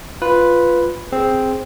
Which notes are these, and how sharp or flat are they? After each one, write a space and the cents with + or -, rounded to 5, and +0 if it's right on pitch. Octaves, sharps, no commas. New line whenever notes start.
F4 +0 B4 +0
C4 +0 G#4 +0